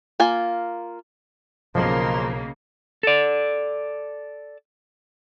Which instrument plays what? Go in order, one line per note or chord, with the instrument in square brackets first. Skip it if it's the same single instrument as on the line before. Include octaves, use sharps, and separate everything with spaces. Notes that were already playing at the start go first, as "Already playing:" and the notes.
[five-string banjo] A#3 F4 G#5
[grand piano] B1 [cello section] C#3 A#3 [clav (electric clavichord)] F3 [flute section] A#4 D#5 C6
[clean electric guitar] A4 D5